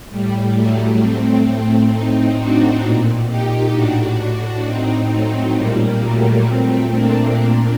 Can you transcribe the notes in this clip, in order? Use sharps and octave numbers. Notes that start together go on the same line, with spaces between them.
A2 G3
F#3 A3
A2 A3 C4
A3 C4
A2 C4 D#4
D4 F#4
A#2
D#4 G4
A2 D4 F#4
A2 C4 D#4
F#3 A3
A#2 G3 A#3
F#3 A3
A#2 A3 C4
A#3 D4
A#2 A#3 D4